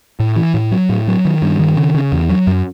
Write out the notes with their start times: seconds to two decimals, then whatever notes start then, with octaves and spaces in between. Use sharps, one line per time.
0.20 A2
0.36 E3
0.54 A2
0.71 F#3
0.89 A2
1.08 F#3
1.25 D#3
1.42 G2
1.59 D#3
1.77 C#3
1.94 C#3
2.12 E2
2.29 F#3
2.47 F#2